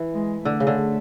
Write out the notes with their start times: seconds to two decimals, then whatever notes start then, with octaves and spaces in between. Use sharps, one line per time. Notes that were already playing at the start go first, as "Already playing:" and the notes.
Already playing: E3
0.13 G#3
0.45 D3 A3
0.60 C#3
0.67 D3